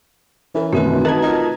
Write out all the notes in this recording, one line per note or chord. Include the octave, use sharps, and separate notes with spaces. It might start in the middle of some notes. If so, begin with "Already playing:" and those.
E3 C#4 A#4 B4
F#2 B2 D#3 A3 C4 F#4
D#4 F#4 B4 D#5 A5 A#5 G#6
D#4 F4 A#4